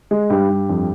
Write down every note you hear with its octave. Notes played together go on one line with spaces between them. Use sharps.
G#3
G2 G4
G2
F2